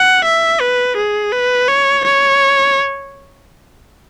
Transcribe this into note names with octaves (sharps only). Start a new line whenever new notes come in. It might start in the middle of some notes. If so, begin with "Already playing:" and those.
Already playing: F#5
E5
B4
G#4
B4
C#5
C#5